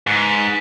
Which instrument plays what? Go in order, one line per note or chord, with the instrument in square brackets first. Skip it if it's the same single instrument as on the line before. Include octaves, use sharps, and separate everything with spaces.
[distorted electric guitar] G#2 [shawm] B4